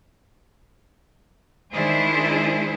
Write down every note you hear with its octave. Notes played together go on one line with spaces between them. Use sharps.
D#3 G#3 D4 E4 G#4 C5